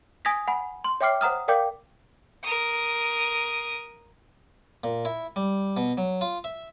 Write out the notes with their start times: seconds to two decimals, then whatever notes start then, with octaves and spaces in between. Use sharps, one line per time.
0.25 G#5 D#6 G#6 A#6 B6
0.48 F#5 G#5 B5
0.84 C6
1.01 C#5 E5 G5 D6 F6 C7
1.21 C5 F#5 A#5 D#6 F6
1.48 A#4 D5 F5 G5 D6 G6
2.44 A#4 D#6
4.84 A#2
5.05 E4
5.36 G3
5.77 B2
5.98 F#3
6.21 F4
6.44 E5